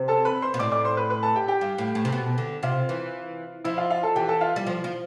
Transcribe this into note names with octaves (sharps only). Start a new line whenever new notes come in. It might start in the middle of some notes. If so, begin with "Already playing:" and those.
Already playing: C3
A4 A5
B4 B5
C5 C6
B2
A2 D5 D6
D5 D6
C5 C6
B4 B5
B4 B5
A4 A5
G4 G5
G4 G5
G2
A2
A2
C3
B2
D3
C3 F4 F5
E3
F3 E4 E5
F4 F5
F4 F5
A4 A5
E3 G4 G5
A4 A5
F4 F5
G3
F3
F3